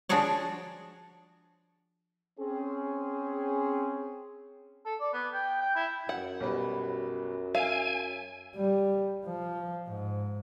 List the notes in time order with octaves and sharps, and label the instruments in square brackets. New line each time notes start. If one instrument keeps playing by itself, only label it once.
[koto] F3 D4 F#4 G#4 C#5 D5
[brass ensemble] C4 C#4 G#4
[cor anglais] A4
D5
B3
G5
G5
E4
[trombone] F#2 [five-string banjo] F#5
[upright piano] B1 G3 B4
[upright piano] E5 [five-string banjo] F5 [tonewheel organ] G#5
[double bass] G3
F3
G#2